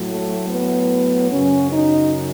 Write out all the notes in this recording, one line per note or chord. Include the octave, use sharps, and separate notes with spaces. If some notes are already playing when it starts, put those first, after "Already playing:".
Already playing: A2 F#3
A3
B3
F#2 C#3 F#3 C#4
D#4